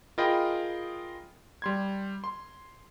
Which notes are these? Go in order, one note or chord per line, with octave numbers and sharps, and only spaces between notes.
F4 G#4 A#4 D#5 G5 B5
G3 C6 G#6
C6